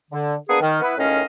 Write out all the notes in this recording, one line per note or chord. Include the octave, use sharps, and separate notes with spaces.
D3
A#3 B3 D4 G#4
D#3
B3 E4 B4
C#2 A2 D#3 C#4 D#5 F5